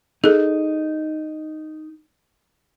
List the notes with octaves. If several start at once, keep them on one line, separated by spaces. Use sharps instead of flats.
D#4 G#4 A4